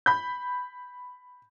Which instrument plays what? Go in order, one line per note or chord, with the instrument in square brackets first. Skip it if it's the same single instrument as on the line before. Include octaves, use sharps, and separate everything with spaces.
[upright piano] B5 G6